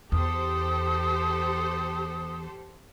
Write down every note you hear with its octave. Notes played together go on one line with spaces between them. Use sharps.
E2 G4 A4 C5 D#6